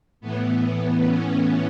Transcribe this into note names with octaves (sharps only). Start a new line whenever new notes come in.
A2 E3 B3
C#4